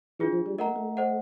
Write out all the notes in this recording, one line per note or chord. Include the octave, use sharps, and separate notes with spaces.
E3 D4 F4 G#4
F3
G3
A3 A#4 D#5 F#5 A#5
A#3
A3
C5 D#5 F#5